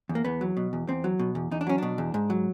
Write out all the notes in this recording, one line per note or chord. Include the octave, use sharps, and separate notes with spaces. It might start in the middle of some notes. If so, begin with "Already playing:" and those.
E2
A#3
E2 B3
F#3
B2
E2
E2 C4
F#3
B2
E2
E2 D#4
D4
F#3 C#4
B2 D4
E2
G#2
F#3